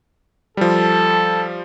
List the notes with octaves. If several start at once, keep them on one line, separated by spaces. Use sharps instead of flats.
F3 G3 A4